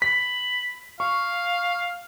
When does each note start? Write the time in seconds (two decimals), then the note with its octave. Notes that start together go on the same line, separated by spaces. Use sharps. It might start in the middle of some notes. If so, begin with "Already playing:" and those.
0.02 B5 B6
1.00 F5 C#6